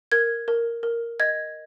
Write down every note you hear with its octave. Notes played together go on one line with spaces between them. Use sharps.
A#4 G#6
A#4
A#4
D#5 G#6